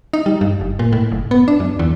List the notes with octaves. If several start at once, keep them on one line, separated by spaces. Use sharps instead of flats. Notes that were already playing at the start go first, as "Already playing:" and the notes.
D#4
G3
G2
F#1
A#2
A2
F#1
B3
D4
F#2
E2